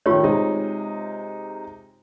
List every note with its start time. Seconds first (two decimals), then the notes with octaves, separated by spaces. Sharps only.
0.06 D#3 A3 F4 G4 C#5
0.23 C3 G#3 D#4